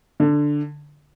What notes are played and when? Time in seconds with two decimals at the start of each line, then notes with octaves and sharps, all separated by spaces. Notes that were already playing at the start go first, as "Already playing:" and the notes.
0.20 D3